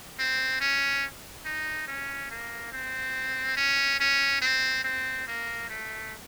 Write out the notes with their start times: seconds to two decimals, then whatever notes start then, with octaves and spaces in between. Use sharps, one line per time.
0.19 C4
0.60 C#4
1.45 D#4
1.87 C#4
2.31 A#3
2.72 C4
3.57 C#4
4.00 C#4
4.42 C4
4.84 C4
5.28 A#3
5.70 A3